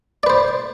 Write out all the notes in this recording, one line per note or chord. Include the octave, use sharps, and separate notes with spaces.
B4 C5 D5